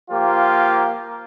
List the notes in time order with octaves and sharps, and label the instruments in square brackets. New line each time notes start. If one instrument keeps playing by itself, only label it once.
[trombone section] F3 A#3 F4 G4